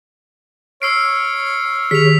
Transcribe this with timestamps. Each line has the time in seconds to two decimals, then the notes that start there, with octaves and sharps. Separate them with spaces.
0.82 C#5 E6 F6 C7 D7
1.91 D#3 G4 G#4 B6 F7